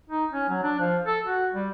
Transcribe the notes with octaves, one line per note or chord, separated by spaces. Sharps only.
D#4
C#4
F#3
D4
F3
A4
F#4
G3